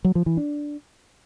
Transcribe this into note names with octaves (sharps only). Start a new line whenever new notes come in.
F#3
F3
E3
D4